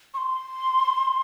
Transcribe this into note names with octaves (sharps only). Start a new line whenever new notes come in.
C#6
C6